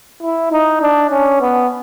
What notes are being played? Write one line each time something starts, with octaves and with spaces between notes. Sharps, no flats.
E4
D#4
D4
C#4
B3